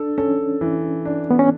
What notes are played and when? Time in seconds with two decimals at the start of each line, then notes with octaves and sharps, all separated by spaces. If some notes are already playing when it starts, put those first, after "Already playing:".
Already playing: D4 A4
0.18 C#4 A4
0.61 E3
1.05 D4
1.31 B3
1.39 C#4